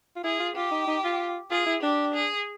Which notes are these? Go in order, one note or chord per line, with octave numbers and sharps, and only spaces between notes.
F4
E4 G#4
F4
F4 G4
D#4
D#4
F4
F4 G#4
E4
D4 G4
G#4